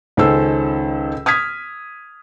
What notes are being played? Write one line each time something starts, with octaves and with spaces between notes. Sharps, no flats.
C#2 D#3 C#4 A4 C5 E6
D#6 F6 G#6 B6